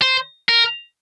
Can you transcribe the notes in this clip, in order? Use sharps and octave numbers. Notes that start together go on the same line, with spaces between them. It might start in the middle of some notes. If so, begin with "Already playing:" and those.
C5
A#4